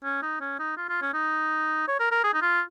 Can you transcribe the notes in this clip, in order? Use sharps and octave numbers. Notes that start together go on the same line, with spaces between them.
C#4
D#4
C#4
D#4
F4
F4
C#4
D#4
C#5
A#4
A#4
G#4
D#4
F4